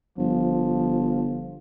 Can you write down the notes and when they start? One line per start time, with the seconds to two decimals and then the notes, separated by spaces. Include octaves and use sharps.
0.18 G1 F3